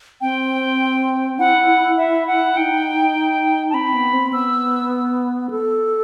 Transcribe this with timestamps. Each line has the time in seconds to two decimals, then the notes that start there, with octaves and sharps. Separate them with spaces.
0.21 C4 G5
1.39 E4 F#5
1.97 E5
2.27 F#5
2.57 D#4 G5
3.70 A5
3.74 C4 B5
3.94 B3
4.13 C4
4.33 B3 E6
5.50 A4